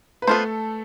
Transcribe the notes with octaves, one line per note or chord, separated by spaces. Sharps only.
B4
A3 B3 F4 A4 C5